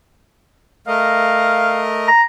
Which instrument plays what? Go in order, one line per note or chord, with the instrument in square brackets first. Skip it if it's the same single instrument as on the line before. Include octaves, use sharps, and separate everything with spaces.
[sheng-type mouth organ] A3 A#4 D#5 [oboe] F5
[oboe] A#5